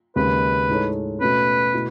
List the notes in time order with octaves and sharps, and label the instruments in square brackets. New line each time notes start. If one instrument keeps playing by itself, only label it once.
[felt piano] D#2 C#3 G#3 [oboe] B4
[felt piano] A2 G#3 D#4 A4 C#5
[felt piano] B2 A3 C#4 [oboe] B4
[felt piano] B2 A3 E4